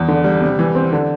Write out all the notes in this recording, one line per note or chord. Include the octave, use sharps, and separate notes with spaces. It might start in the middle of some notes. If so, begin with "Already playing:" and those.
Already playing: E2
D3
G3
C3
E3
C4
D3